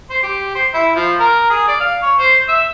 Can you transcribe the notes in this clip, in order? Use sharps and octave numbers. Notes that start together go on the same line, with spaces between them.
C5
G4
C5
E4
F3
A#4
G#4
D5
F5
C#5
C5
E5